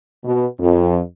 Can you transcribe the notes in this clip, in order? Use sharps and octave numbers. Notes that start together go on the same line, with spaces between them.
B2
F2